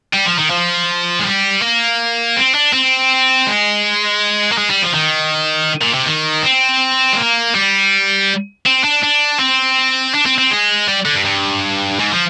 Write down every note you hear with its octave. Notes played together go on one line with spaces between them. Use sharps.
G3
F3
D#3
F3
G#3
G3
A#3
C4
D4
C4
G#3
A#3
G#3
G3
F3
D#3
A#2
C3
D#3
C4
G#3
A#3
G3
C4
D4
D4
C4
D4
C4
C4
G#3
G3
D3
G2
G2
G#2
F3